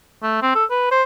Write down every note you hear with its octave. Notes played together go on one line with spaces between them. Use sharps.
A3
C4
A4
B4
C5